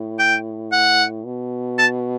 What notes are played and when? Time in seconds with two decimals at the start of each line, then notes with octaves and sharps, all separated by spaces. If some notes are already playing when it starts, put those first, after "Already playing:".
Already playing: A2
0.19 G5
0.72 F#5
1.26 B2
1.79 A5